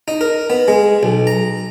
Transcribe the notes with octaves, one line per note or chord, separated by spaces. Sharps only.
D#4
A#4
B3
G#3
B1
A#5